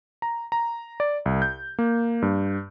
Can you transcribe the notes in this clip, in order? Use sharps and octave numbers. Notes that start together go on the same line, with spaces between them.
A#5
A#5
D5
C2
G6
A#3
G2